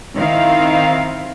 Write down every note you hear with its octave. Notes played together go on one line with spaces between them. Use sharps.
D#3 C4 E4 F5